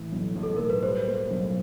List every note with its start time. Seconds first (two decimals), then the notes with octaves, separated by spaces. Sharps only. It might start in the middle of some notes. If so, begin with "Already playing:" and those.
Already playing: A2 E3
0.12 B1
0.35 B1
0.43 A4
0.56 A2 A#4
0.70 B4
0.83 G3 C5
1.07 A#3
1.31 B1